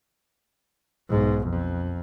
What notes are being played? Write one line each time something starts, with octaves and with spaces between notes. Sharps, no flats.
B1 G#2
F2